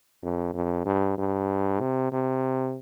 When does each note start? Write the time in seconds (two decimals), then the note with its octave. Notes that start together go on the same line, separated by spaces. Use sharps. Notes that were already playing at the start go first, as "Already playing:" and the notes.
0.23 F2
0.54 F2
0.86 G2
1.18 G2
1.81 C3
2.12 C3